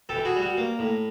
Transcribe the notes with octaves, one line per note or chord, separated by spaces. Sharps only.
G4 A4
E3
F#4 G#4
G3
F#4
A#3
A2